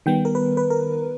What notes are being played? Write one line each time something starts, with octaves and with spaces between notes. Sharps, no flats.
D#3 G3 B3 G5
A#4
B4
B4
A#4